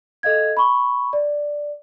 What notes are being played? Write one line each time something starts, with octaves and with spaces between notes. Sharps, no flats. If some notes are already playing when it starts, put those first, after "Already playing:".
A4 D#5 F5 G#6
B5 C#6
D5